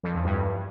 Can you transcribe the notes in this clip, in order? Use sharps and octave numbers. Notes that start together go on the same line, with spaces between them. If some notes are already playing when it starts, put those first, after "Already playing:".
F2
E2
G2